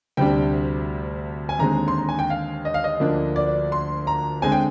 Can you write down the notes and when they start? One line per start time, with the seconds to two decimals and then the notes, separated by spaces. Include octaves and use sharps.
0.17 D2 C3 G3 D4 G5
1.49 G#5
1.59 D#2 D3 G#3 C4 A#5
1.88 C6
1.98 A#5
2.09 G#5
2.19 G5
2.30 F5
2.65 D#5
2.74 F5
2.84 D#5
3.00 D2 D3 F3 A#3 D4
3.36 D5
3.72 C6
4.07 A#5
4.42 D3 G#3 C4 G#5
4.52 G5